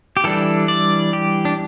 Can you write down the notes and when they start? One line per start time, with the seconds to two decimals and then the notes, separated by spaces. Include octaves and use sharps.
0.17 G4
0.24 E3 G3 D4 A4
0.68 D5
1.13 G4
1.45 D4